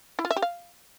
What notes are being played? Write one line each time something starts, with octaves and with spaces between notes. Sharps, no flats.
E4
F4
E5
G4
F5